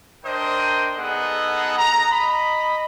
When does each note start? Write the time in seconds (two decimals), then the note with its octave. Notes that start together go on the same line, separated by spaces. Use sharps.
0.24 D4 A#4 C5 D#5 G5 D#6
0.98 B3 D#4 G#4 A4 D#5 F#5
1.78 A#5
2.12 D#5 B5